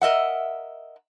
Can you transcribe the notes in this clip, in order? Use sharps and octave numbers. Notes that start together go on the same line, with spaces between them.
A#4 D#5 E5 F#5